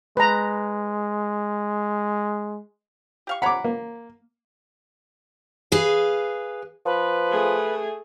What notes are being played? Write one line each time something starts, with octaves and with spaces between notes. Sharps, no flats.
G#3 B4 A#5
G4 F5 C#6
C#5 F#5 A#5 B5 D6
A#3
G#4 B4 F5
F3 B4
A3 G#4